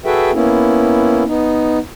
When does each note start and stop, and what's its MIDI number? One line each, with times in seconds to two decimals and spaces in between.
0.05 0.31 66
0.05 0.31 68
0.05 0.31 69
0.05 0.31 71
0.05 0.31 76
0.05 0.31 79
0.34 1.24 58
0.34 1.24 59
0.34 1.24 61
0.34 1.24 64
1.28 1.79 59
1.28 1.79 63